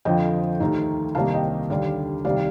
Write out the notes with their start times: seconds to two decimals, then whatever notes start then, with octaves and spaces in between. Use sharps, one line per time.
0.05 F2 D3 F3 D#5 G5
0.60 D#2 D#3 A3 D#4
1.15 C2 C3 D#3 A#3 D#4 F5 A5
1.33 D#5 G5
1.70 D#2 D3 G3 D4 D5 F5
2.25 C2 C3 D#3 G3 D5 F5